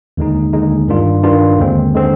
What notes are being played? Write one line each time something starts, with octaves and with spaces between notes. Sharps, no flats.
D#2 D3 G#3 D#4
D#2 D3 G#3 D#4
G2 D#3 G3 D4 F4
G2 D#3 G3 D4 F4
D#2 D3 G#3 C4
D3 G#3 C4